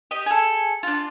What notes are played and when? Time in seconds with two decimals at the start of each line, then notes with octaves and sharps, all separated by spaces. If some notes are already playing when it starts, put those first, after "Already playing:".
0.11 G4 D#5
0.26 G#4 A4
0.83 D4 F4